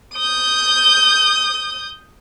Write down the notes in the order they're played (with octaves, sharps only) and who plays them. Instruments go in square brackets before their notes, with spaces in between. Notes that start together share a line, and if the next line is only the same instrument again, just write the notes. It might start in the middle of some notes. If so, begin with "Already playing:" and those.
[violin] D#6 G6